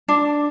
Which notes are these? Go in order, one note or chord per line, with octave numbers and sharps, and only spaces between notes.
D4